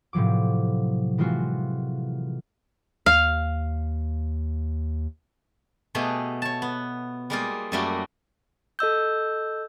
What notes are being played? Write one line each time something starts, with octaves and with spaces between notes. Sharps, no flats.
A2 C3 F3 F#3 D6
E3 G#3 C4 F4 F#4
D#2 F5
B2 A3 G4 G#4
C#5 A5
B3
G3 G#3 A#3 D#4 F4
F#2 F#3 G3 A3 A#3 F#4
A4 D#5 E6 G6